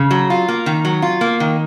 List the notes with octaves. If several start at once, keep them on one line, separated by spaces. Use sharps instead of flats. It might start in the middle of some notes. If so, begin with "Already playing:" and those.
Already playing: C#3
F#3
F4
A#3
D#3
F#3
F4
A#3
D#3